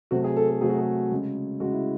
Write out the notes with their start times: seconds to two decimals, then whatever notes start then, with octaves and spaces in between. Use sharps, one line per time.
0.11 C3 F#3 A3 F#4
0.24 G#4
0.36 A4
0.49 A4
0.61 C3 F#3 A3 G#4
0.69 F#4
0.78 G#4
1.11 C#3 G#3
1.60 C#3 G#3 F#4
1.72 E4